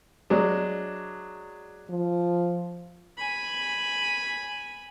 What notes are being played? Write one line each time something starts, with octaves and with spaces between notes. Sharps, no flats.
F#3 G#3 D4
F3
G#5 B5